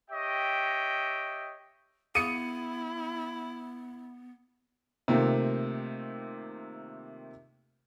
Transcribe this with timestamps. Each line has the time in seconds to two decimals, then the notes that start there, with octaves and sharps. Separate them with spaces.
0.11 G4 C#5 D#5 E5 G5
2.15 B3 E4 G#4 F5 D#6 C#7 D#7
5.08 C3 D#3 A3 A#3 C4 F4